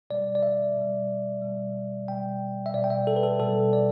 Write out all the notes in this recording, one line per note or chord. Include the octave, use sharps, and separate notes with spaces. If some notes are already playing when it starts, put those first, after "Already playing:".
B2 G3 D5
D5
E5
B2 G3
B2 G3
B2 G3 G5
E5
B2 G3 D5
G5
E5
A4
B4
A4
B2 G3 A4
D5